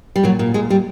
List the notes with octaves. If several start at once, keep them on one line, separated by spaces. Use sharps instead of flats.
G3
A#2 F#3
A#2
A#2 G#3
A#2 G3